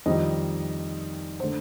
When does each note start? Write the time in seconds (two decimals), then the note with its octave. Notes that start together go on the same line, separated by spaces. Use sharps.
0.06 F2 D#3 G3 D#5
1.40 D3 A3 C5